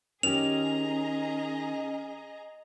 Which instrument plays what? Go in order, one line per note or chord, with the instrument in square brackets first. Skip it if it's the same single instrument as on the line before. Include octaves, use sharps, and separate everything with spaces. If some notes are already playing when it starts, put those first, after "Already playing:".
[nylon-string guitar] D#3 G4 [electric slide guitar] C#4 [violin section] G#4 D#5 A#5 [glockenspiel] F7